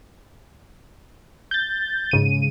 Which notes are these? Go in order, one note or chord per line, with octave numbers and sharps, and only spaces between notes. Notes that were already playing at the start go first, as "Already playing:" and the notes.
G6 A6
G#2 C#3 D#7